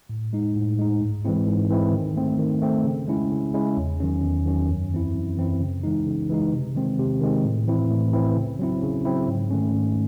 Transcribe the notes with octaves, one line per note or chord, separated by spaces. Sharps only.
A2
G#3 D#4
A2
G#3 D#4
G#2
E3 G#3 C4 E4
G#2
E3 G#3 C4 E4
D#3
A3 C4
D#3
A3 C4
C#3
G#3 C#4 E4
C#3
G#3 C#4 E4
E2
D#3 F#3 C#4
E2
D#3 F#3 C#4
F#2
E3 C4 E4
F#2
E3 C4 E4
C#3
E3 G#3 D#4
C#3
E3 G#3 D#4
C3
D#3 G#3 C4
C3
D#3 G#3 C4
A2
E3 C4 E4
A2
E3 C4 E4
C#3
F#3 C4 E4
C#3
F#3 C4 E4
G#2
D#3 A3 C#4
G#2